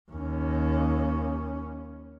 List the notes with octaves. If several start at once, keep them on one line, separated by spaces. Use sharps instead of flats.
D#2 C#4